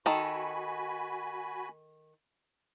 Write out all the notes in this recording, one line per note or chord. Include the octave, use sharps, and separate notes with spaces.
D#3 F#4 A4 G#5 B5